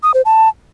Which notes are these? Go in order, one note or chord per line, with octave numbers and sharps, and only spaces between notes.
D#6
C5
A5